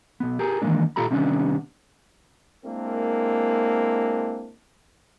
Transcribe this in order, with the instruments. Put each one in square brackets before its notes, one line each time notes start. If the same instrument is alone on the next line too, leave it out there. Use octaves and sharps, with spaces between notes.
[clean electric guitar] B1 B3
G4 G#4 A#4
D#3 E3 G#3 A#3 D4
A#2 F4 G4 A4 A#5 B5
C3 D#3 G3 B3 C#4 D4
[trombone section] G#3 A#3 C4 D4 E4 A#4